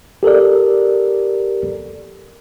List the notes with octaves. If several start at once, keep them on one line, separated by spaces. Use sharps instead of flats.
G4 A4 A#4 D5